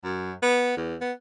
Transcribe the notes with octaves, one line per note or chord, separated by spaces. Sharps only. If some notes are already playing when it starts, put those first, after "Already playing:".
F#2
B3
E2
B3